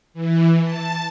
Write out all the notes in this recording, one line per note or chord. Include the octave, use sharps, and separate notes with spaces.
E3
A5